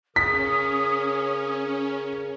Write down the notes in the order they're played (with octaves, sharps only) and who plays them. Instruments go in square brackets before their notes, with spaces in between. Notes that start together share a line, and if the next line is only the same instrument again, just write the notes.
[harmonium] C#3 A#4 [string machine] C#4 [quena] D#6 [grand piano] B6